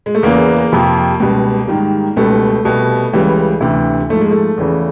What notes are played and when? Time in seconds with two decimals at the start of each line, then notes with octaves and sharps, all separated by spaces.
0.06 G#3
0.15 A3
0.23 E2 C#3 E3 A#3
0.72 F2 C3 F3
1.20 C#2 B2 G3
1.68 G#2 D#3 G3
2.16 C#2 B2 G3 A3
2.65 C2 B2 G3
3.13 C#2 C#3 E3 G3
3.61 D2 C3 E3
4.09 G#2 F3 A3
4.21 G#3
4.31 A3
4.58 E2 C#3 E3